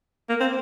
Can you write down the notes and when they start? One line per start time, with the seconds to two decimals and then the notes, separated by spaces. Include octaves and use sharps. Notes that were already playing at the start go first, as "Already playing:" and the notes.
0.29 A#3
0.40 C4